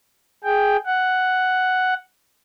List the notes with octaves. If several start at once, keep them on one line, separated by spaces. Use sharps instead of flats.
G#4 G5
F#5